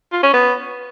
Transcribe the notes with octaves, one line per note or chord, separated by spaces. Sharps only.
F4
C#4
B3